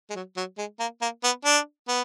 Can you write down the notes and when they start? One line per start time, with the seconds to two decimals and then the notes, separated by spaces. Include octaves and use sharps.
0.10 G#3
0.15 F#3
0.37 F#3
0.58 G#3
0.80 A#3
1.02 A#3
1.24 B3
1.45 D4
1.88 B3